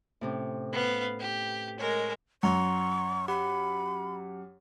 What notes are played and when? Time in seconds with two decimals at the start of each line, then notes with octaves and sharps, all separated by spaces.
0.21 A2 C3 C#4
0.73 B3 B4 F5
1.20 G4
1.79 G#3 A#4 C#5
2.43 F#2 F#5 A#5 C6 C#6
3.28 G4 F#5 B5